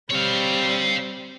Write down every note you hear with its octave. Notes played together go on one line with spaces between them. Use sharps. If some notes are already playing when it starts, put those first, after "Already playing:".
G3 C4 C#5 F5